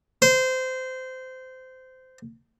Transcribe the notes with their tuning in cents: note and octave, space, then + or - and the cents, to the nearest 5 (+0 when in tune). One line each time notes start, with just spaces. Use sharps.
C5 -20